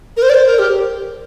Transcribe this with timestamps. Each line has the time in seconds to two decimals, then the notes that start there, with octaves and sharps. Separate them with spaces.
0.17 A#4
0.22 C5
0.29 D5
0.34 C5
0.46 A#4
0.59 G4